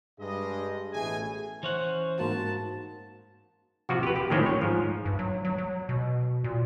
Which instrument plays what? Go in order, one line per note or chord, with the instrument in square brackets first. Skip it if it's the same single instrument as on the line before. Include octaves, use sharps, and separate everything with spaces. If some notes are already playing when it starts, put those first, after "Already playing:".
[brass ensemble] G2 G#3 D#5
A1 B2 A3 G#4 G#5
[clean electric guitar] E3 C#4 F#5 [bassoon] C5
[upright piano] G#2 A#3 F#4 [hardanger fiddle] A5
[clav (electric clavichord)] C3 F3 F#4
G4 B4
G4
A2 D#3 F3 C4 C#4
C#5
G#2 F3
[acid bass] G2
F#3
F#3
F#3
B2
A#2